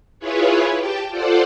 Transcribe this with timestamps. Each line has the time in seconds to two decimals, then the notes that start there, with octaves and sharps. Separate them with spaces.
0.19 E4 F4 G#4 B4 C#5
0.76 G4 G5 A5
1.10 F4 A4 C5 D5 F#5